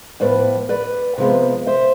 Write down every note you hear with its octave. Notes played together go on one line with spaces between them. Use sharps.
A2 F3 B3 B4 D5
B4 D5
C3 F3 G#3 B3
C5 E5